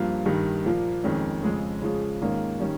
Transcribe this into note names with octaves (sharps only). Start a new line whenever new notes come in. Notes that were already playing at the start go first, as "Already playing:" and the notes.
Already playing: G2 F3 A#3 F4
G2 D#3 G3
A#2 F3 A#3
F2 D#3 G#3 C#4
F2 C#3 F3 G#3
C#3 F3 G#3
G#2 D#3 A#3 C#4 F4
D#3 G3 C#4